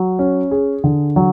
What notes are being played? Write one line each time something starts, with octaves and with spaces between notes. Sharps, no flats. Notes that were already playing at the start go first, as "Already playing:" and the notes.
Already playing: F#3
C#4
G#4
D3
F#3